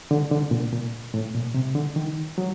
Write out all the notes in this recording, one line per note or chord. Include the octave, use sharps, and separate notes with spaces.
D3
D3
A#2
A#2
A2
A#2
C3
D3
D#3
F#3